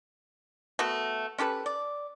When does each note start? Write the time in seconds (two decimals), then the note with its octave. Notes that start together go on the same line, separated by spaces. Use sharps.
0.79 A3 B3 F#4
1.38 C#4 G4 A4 B4
1.66 D5